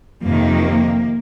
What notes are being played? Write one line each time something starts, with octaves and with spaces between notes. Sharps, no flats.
F2 C3 D#3 A#3